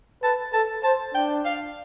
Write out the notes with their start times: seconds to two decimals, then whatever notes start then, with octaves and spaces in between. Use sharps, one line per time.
0.23 B4 A5
0.53 A4 A5
0.83 C5 A5
1.14 D4 G5
1.45 F5